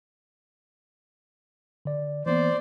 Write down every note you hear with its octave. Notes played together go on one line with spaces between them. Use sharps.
D3 D5
E3 A#3 B3 C5 D5